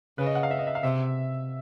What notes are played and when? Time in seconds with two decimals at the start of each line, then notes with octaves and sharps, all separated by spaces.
0.18 C#3 B4
0.26 D#5
0.35 F#5
0.43 F5
0.51 E5
0.59 D#5
0.67 E5
0.75 F5
0.83 C3 E5